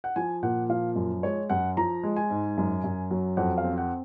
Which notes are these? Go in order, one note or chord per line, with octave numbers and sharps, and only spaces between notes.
F#5
F3 G#5
A#2 F#5
F3 F5
F#2
G#3 C#5
F#2 F#5
F3 A#5
G#3
G#5
G#2
F#2
F#2
F#3
F2 F#5
F5
C4
F#5